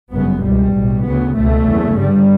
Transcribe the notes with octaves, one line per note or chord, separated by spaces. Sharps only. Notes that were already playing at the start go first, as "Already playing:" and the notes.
G1 F#2 C#3 B3
C#2 B2 G3
B1 A2
D2 C#3 B3
C#2 B2 A3
F#1 E2 C#3
G1 G2 G3